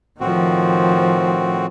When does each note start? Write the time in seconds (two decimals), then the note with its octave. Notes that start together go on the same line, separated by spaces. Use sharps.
0.20 A2 D#3 F3 C4 F#4